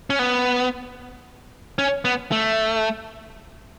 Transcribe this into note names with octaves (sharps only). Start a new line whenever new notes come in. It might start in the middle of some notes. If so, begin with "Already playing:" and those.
C#4
B3
C#4
B3
A3